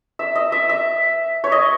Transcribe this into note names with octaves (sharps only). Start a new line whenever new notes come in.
E5
D#5
E5
E5
C#5
D#5